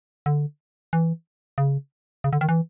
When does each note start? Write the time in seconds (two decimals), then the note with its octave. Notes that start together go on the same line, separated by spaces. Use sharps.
0.26 D3
0.93 E3
1.58 C#3
2.24 C#3
2.33 D3
2.41 D#3
2.49 E3